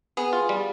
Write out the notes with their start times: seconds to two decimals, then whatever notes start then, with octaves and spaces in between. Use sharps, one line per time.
0.17 B3 G#4
0.33 F4
0.49 G3